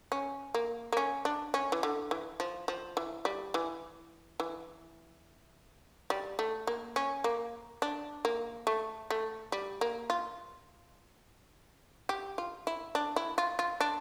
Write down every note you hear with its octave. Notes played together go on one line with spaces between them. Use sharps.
C#4
A#3
A#3
C#4
D4
C#4
E3
D3
E3
F3
F3
E3
G3
E3
E3
G3
A3
A#3
C#4
A#3
D4
A#3
A3
A3
G3
A#3
F4
G4
F4
E4
D4
E4
F4
F4
D4